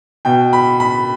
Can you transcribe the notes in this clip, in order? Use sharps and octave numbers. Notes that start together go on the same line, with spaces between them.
B2 G5
B5
B5